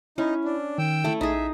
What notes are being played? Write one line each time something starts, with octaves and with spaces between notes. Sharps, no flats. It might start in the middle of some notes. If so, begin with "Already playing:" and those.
C#4 D#4 E4 B5
D4
D#3 G5 E6
A3 E4
A#1 D#4 G#4 E5